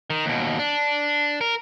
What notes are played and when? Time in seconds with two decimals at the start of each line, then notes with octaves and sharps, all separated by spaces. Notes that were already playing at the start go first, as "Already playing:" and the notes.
0.10 D#3
0.26 D#2 B2
0.59 D4
1.41 A#4